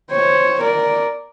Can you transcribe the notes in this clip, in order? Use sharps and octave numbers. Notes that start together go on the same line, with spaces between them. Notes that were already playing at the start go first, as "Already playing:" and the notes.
C5 C#5
A#4 D5